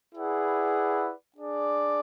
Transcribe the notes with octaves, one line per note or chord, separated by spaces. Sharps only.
E4 G#4 B4 D5 F#5
D4 G#4 D5